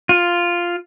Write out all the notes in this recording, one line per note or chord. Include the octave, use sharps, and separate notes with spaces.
F4